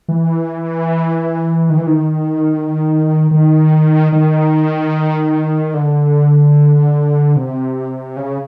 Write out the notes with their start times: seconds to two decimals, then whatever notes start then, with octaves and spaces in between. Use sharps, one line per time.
0.08 E3
1.70 D#3
1.78 E3
1.87 D#3
3.31 D#3
4.13 D#3
5.74 D3
7.36 C3
8.17 C#3